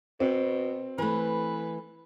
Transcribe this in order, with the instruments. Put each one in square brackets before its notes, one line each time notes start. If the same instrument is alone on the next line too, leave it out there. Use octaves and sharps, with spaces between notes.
[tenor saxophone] B2 [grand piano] C4
[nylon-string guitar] E3 A3 [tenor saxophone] B4